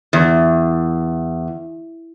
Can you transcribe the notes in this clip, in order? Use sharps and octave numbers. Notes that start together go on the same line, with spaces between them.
E2